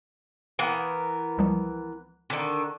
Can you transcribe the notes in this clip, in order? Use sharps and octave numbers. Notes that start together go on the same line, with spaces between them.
E3 B3 A#4 F5 F#5
C#2 F3 G3
D3 D#3